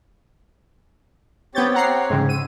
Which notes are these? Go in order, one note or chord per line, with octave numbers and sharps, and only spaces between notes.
B3 C4 G4 C#5 G6 A6
F#5 A#5 C7
G#2 C#3
E6 D#7